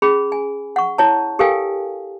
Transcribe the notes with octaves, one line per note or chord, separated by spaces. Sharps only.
C#4 G#4 B5
G#5
F#5 C#6
E4 C#5 A5
G4 A4 A#4 F5 G5 G#5